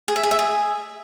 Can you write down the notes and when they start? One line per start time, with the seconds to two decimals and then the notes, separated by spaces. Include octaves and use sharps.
0.08 G#4
0.16 E5
0.23 G#4
0.31 E5
0.39 G#4